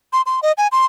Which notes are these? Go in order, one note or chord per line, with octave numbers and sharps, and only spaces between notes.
C6
C6
D#5
G#5
C6